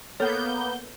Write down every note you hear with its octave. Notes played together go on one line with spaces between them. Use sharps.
A#3 B3 A4 C#5 G6